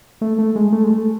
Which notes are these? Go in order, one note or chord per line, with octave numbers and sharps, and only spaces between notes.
A3
A3
G#3
A3
G#3
A3